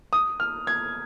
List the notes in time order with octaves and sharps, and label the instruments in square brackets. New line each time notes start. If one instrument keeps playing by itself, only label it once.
[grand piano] D#6
F6
G#6